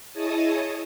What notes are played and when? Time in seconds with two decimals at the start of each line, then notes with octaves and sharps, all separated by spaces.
0.12 E4 G#4 C#5 D#5 A5 D#6